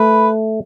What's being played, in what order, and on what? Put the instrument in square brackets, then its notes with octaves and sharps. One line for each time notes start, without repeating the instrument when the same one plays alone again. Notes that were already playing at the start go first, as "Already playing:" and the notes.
Already playing: [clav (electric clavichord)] A3 [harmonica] B4